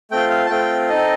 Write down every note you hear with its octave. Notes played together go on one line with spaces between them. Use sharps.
A3 C4 F4 G5
F5
A5
A3 C4 F4 G5
C4 D#4 A4 D#5